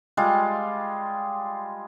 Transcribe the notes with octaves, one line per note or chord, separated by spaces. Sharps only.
G3 G#3 F4